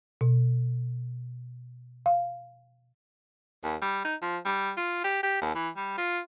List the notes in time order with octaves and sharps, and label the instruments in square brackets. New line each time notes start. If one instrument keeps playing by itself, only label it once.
[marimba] B2
F5
[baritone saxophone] D#2
G3
D#4
F3
G3
F4
G4
G4
D#2
E3
G3
F4